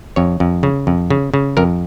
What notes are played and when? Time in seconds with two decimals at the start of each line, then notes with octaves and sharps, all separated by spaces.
0.16 F2 C#5
0.40 F2
0.63 C#3
0.87 F2
1.10 C#3
1.34 C#3
1.57 F2 A#4